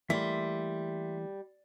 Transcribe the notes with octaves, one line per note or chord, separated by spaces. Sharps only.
E3 G3 A3 A#3 E5 C6